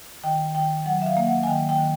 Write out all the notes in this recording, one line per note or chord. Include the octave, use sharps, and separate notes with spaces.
D#3 G5
D#3 G5
F#3 F#5
E5
F5
A#3
F#5
G#5
D#3 G5
G5
D#3